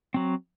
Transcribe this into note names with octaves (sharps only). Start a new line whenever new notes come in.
F#3 C4